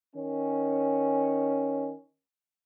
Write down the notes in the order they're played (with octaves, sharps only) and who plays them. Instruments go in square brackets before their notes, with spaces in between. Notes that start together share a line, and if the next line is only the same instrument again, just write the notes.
[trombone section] D#3 C#4